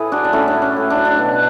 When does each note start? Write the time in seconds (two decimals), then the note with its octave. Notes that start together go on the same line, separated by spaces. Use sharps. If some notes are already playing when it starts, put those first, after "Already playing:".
Already playing: A2 A3 E4 G#4 B4
0.12 F#3 D4 F#4
0.24 D4
0.32 A2 C#4 E4
0.48 D4
0.54 A3
0.62 C#4
0.76 A2
0.90 D4
0.97 F#3
1.05 D4
1.19 B2